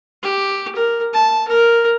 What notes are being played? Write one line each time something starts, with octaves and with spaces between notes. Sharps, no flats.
G4
A#4
A5
A#4